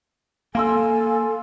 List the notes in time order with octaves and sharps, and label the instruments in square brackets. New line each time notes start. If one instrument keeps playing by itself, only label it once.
[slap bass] A#3 [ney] A4 [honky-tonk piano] F5 C6 E6 [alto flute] G#5